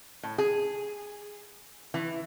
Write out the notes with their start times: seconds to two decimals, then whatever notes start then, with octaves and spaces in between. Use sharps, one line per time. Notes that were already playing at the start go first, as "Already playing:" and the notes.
0.23 A2
0.38 G#4
1.94 E3